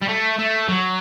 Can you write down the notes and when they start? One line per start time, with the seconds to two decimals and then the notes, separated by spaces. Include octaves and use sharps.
0.02 G3
0.08 A3
0.39 A3
0.68 F#3